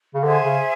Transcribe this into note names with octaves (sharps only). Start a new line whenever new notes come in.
C#3
D3 G#4 C5 E5 G#5
C#3